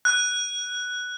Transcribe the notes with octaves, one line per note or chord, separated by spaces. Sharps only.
F#6